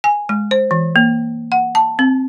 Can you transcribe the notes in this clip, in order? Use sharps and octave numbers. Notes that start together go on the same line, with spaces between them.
G#5
G#3
C5
E3
A#3
F#5
A5
C4